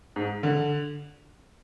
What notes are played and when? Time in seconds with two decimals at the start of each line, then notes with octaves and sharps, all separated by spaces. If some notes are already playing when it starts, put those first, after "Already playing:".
0.16 G#2
0.43 D3